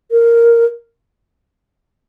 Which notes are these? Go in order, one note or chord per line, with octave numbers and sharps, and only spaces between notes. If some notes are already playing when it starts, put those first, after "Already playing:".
A#4